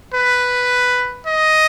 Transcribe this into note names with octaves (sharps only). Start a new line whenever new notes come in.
B4
D#5